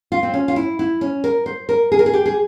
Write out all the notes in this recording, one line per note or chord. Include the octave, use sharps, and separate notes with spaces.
F4
C4
C#4
F4
E4
E4
C#4
A#4
C5
A#4
G#4
A#4
G#4
G4
G#4